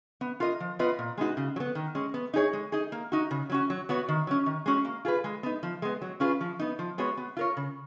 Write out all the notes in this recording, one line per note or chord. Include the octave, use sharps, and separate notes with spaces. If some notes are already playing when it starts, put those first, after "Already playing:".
B3
F4 A#4 D#5
F3
B3 F4 B4 D#5
A#2
G#3 B3 D#4 F#4
C#3
F#3
B3
D#3
G#3 C#4
B3
D#4 G#4 C#5
G#3
D#4 G#4
A#3
D#4 F#4
C#3
F#3 C#4 F#4
F#3
B3 F#4 C#5
D#3
F#3 C#4
D#3
G#3 C#4 F#4
A#3
F4 G#4 B4
G#3
B3 D#4
F3
G#3 B3
F#3
C#4 F4 G#4 B4
F3
B3 D#4
F3
G#3 B3 F#4 C#5
B3
F4 A#4 C#5
C#3